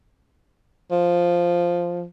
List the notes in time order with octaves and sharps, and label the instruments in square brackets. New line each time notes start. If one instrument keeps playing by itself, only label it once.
[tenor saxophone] F3